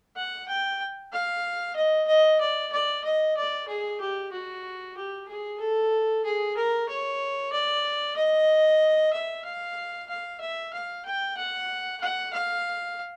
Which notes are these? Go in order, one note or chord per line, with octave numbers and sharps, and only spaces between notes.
F#5
G5
F5
D#5
D#5
D5
D5
D#5
D5
G#4
G4
F#4
G4
G#4
A4
G#4
A#4
C#5
D5
D#5
E5
F5
F5
E5
F5
G5
F#5
F#5
F5